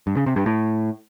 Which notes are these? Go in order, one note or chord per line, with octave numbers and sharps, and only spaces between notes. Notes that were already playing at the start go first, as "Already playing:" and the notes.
G2
C#3
C3
G2
A2